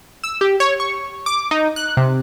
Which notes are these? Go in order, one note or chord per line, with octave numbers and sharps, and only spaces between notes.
E6
G4
C#5
C#6
D6
D#4
F#6
C3